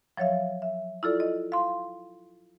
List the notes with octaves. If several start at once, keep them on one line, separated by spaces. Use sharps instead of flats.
F3 F#3 C#5 E5 F5
E5
E4 F4 A4 D5
D#5
F5 C6